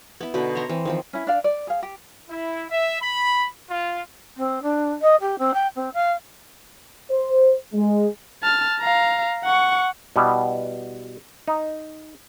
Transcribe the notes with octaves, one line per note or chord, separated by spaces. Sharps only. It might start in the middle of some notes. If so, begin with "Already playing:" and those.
B3 E4
B2 D3 D#4 B4
C#5 E5 A#5 C6
E3 C4
D#3 F3 C4
C#4 E4
D4 D5 F5
D5
G#4 F5
G4
E4
E5
B5
F4
C4
D4
D#5
G4
C4
G5
C4
F5
C5
G#3
A5 F6
F5 A#5
F#5 C#6
B2 G3 B3 E4
D#4